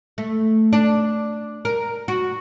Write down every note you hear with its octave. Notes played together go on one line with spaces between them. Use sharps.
A3
D4
A#4
F#4